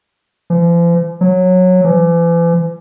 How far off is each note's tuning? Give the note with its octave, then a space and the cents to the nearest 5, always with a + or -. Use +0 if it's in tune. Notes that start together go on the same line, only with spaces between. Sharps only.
F3 -45
F#3 -15
E3 +40